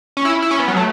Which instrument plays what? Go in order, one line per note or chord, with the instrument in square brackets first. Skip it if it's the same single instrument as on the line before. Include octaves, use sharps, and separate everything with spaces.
[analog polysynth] C#4
E4
E4
C#4
B3
F#3
A3